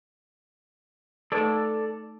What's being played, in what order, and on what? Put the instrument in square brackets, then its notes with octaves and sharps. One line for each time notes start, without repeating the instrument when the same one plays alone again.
[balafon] A3 D#4 B4 [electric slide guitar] A4 D5